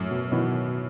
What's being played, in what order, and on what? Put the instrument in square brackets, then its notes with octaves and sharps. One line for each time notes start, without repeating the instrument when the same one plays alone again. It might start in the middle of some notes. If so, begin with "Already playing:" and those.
Already playing: [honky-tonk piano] F#2 [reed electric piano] A2
[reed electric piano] B2
[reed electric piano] B2 D#3 [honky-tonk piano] E3